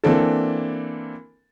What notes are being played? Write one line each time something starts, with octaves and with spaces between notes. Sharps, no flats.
E3 A#3 C4 D4 A4